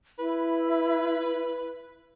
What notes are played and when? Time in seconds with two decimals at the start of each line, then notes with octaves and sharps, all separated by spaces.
0.19 E4 B4